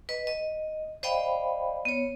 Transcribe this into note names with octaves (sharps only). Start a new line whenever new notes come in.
B4 D#5
D#5
C5 D5 D#5 F5 G5 B5
B3 C#5